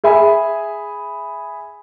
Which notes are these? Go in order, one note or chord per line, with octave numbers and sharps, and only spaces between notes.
G#4 E5 G#5 B5